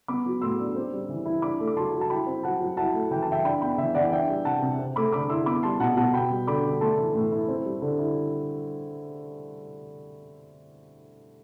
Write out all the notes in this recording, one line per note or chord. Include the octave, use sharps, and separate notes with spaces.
B3 B5 D6
F#3
A2 C6 E6
D4
C4
G3
E3
E4
D4 B5 D6
A3
D6
F#3 A5 C6
F#3
A5
E4 G5 B5
C4
F#3 F#5 A5
F#3
E4 F#5 A5
A3
E3 G5
A5
E3 E5 G5
D4 G5 B5
B3 G5 B5
E3 E5
E3 D5 F#5
D4 E5 G5
G3
C3 F#5 A5
C3
C4
A3 B5 D6
D3 B5 D6
E4 C6 E6
B3 B5 D6
G3 A5 C6
B2 F#5 A5
B2 F#5 A5
B3 G5 B5
G3
D3 B5 D6
D4
A3 A5 C6
E3
A2
E4
C4
G3
D3
E4